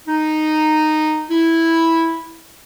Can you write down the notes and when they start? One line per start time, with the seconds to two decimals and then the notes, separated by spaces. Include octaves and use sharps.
0.07 D#4
1.30 E4